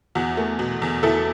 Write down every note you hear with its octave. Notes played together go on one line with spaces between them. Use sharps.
E2 F#4
A3
B2
E2
E2 E4 A4